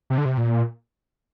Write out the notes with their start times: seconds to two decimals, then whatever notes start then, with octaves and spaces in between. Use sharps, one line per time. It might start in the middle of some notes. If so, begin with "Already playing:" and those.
0.10 C3
0.18 D3
0.25 C3
0.37 A#2